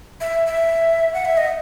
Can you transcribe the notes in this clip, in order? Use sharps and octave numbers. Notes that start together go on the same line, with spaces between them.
E5
E5
F#5
E5
D#5